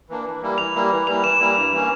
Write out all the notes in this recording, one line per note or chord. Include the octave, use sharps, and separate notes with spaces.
E3 A#3 D4
E3
G3 A#3 E4
E3 F7
G3 A#3 E4
E3
G3 A#3 E4 F7
E3 E7
G3 A#3 E4
G2
E3 A#3 C#4